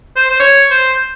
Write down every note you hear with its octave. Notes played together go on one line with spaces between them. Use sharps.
C5
C5
C#5
C5